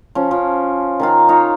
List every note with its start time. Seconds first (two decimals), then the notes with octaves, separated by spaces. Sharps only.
0.15 F3 C#4
0.31 F3
1.00 D#3 D#4 F4
1.29 D#4 F4 C#5